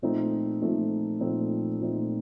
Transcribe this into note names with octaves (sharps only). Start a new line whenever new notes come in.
A#2 F3 A3 C4 D#4
A#2 F3 A3 C4 D#4
A#2 F3 A3 C4 D#4
A#2 F3 A3 C4 D#4